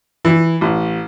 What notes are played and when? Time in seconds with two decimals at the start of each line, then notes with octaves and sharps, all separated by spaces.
0.25 E3
0.61 A1